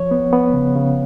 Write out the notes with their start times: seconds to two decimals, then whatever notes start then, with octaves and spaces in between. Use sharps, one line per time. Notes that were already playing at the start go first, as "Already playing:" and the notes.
Already playing: F3 C#5
0.11 B3
0.33 B3
0.53 C#3
0.76 C#3